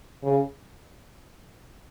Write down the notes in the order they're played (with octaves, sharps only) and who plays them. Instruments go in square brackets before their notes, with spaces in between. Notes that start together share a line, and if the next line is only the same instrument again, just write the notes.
[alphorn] C#3